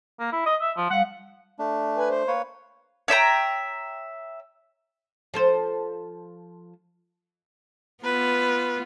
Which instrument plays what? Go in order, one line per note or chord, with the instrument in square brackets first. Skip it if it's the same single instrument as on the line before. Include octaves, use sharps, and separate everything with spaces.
[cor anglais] A#3
E4
D#5
E5
F3
[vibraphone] G3 F5 [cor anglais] F#5
[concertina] A3 D4
[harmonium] B4 G#5
C5
[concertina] A#3 B4 C#5
[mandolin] C#5 E5 G5 A#5
[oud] F3 A4 C5
[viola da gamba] B3 F4 [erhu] B4